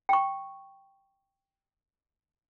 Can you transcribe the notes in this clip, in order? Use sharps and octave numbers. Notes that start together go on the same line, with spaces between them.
G5 C#6